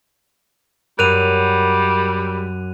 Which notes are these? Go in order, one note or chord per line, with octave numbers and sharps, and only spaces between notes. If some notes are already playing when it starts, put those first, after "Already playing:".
F#2 G3 A#4 F#6 D#7 F7